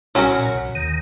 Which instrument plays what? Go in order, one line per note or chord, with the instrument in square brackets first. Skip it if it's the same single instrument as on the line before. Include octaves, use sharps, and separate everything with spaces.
[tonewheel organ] B1 B2 [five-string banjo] F#3 C#4 F#4 A#4
[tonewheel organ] B2
A#2
B1 B2
D#2 D#3